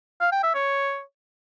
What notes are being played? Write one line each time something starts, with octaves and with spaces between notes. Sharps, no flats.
F5
G5
E5
C#5